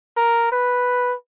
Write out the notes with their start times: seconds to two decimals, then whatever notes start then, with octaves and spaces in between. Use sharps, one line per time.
0.17 A#4
0.52 B4